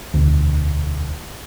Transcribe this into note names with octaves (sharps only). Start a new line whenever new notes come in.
E1 D2